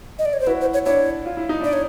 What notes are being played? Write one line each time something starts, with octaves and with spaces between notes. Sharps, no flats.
D#5
D5
C#5
C5
E4 F#4 B4
C5
C#5
D4 E4 C#5
F4
E4
D#4
D4 E4 D5
C#5